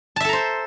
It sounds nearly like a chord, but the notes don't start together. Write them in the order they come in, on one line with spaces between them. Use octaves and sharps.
A5 E5 A4 A#5 C5